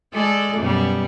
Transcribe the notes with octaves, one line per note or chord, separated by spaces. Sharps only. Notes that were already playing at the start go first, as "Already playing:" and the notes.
G#3 A4 D5
F#2 B2 G3